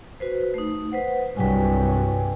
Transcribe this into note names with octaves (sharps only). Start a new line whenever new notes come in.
F#4 B4 C5
A3 D#4
B4 C5 F#5
C2 G2 F#3 B4 G5 G#5